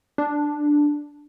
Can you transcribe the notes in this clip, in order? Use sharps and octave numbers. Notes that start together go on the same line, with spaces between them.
D4